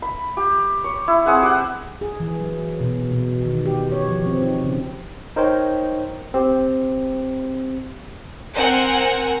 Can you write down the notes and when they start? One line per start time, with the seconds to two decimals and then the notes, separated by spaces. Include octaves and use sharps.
0.02 B5
0.37 G4
0.84 C#5
1.08 E4
1.26 C4 G#4 C5 F#5
1.43 G4 F#5
2.01 G#4
2.20 E3
2.40 F#3
2.81 B2
3.11 B2
3.45 D#3
3.66 G4
3.92 C#5
4.08 F3
4.26 C4
4.42 D#4
4.64 C#3
5.36 D#4 A#4 C5 C#5 G5
6.34 C4 G4
8.54 C4 A#4 F#5 G#5